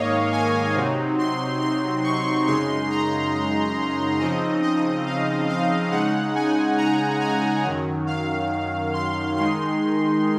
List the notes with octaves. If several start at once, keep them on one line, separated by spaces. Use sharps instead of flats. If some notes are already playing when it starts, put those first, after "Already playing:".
Already playing: G#2 D#3 A#3 C#5 D#5 F5
G#5
C3 F#3 C4 D#4
C6
C6
C#6
F#2 C#3 G#3 D#4 C6
A#5
C#3 F3 C4 D#4 D#5
D#5
F5
F5
C#3 G#3 D#4 F#5
G#5
A#5
G#5
F#2 D#3 F#3
F5
C6
D#3 G#3 D#4 C6